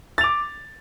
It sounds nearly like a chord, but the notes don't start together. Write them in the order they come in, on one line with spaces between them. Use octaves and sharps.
A6 F7 D6